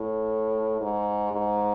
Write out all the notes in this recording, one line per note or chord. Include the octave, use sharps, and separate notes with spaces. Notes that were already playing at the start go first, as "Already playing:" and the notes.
Already playing: A2
G#2
G#2